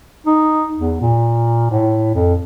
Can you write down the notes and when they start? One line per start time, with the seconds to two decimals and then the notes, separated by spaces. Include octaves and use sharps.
0.27 D#4
0.77 E2
1.01 A#2
1.71 A2
2.14 F2